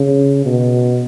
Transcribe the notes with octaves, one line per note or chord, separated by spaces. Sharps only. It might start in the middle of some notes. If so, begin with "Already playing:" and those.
Already playing: C#3
B2